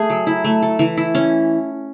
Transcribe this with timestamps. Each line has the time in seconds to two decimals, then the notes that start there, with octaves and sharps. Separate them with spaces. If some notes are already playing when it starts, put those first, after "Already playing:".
Already playing: A3 G#4
0.10 F#3
0.27 E4
0.44 A3
0.62 A4
0.79 E3
0.97 E4
1.15 C#4